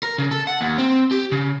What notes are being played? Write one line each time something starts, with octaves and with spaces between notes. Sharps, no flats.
A#4
C#3
A4
F#5
D#2
C4
G4
C#3